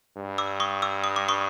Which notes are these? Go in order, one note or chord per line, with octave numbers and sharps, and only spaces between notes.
G2
D6 E6
C#6 D#6
D6 E6
D#6
D6
C#6 D#6